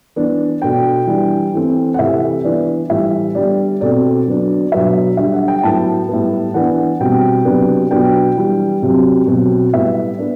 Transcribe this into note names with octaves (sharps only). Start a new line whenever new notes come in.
E3 B3 D4
B2 A3 D4 G5
E3 G3 D4
E3 A3 C4
F#5
C3 E3 A3 C4 E5
E3 B3 D4 D5
A2 E3 G3 E5
D3 G3 B3 D5
B2 A3 C4 D5
D3 F#3 B3 D4
B2 F#3 B3 D4 E5
D3 G3 D4 E5
F#5
G5
A2 F#3 B3 A5
A2 G3 B3
E3 B3 D4 F#5
B2 G3 C4 G5
C3 F#3 B3 D4
B2 F#3 B3 D4 G5
E3 G3 D4
C3 F#3 C4
B2 F#3 C4
A2 G3 B3 E5
B3 D4